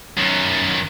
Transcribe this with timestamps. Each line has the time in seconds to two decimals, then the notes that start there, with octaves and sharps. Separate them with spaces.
0.18 F#2 D#3